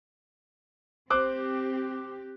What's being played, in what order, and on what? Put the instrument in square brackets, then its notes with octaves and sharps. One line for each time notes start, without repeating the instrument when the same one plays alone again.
[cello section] C4 G4 [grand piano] C5 D6 F#6